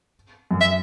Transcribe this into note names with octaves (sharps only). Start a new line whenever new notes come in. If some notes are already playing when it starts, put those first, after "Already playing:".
F#2
E5